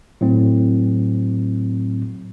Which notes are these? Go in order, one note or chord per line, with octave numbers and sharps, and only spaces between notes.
A2 F#3 C4